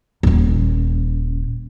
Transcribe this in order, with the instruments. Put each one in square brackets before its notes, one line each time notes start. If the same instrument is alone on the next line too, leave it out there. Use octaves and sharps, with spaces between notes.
[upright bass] D#1 C#4